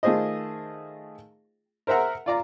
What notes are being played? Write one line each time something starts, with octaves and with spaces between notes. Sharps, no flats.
D#3 A3 F4 G#4 C5 D#5
A#4 C5 E5 F#5 A#5
F4 D5 A#5